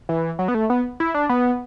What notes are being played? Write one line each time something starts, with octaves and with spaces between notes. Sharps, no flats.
E3
F#3
B3
A3
B3
E4
D4
B3